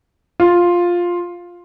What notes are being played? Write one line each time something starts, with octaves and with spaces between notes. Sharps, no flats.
F4